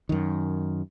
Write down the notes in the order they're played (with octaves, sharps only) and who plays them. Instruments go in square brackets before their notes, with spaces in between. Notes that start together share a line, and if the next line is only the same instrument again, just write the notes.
[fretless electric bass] F#2 D#3